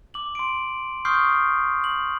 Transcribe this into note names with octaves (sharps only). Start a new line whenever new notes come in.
D6 F#7
C6 D7
C6 C#6 D#6 F6 G6 C7
F#7